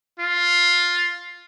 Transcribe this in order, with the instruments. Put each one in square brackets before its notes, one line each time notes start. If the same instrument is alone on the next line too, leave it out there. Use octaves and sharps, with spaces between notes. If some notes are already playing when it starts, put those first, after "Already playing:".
[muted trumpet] F4